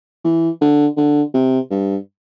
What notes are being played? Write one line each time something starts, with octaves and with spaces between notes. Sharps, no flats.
E3
D3
D3
C3
G2